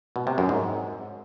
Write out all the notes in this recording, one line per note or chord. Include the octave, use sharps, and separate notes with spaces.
B2
C3
F#2
G#2